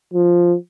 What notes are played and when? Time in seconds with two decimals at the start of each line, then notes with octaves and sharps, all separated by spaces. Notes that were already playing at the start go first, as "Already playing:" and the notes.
0.14 F3